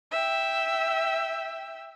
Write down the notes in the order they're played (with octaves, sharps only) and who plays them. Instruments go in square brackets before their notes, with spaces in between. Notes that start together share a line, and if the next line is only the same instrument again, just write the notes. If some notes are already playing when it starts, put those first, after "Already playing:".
[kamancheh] E5 G5